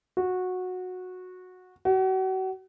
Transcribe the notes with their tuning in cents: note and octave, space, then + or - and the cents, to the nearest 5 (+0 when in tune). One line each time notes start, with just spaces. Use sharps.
F#4 -15
F#4 +35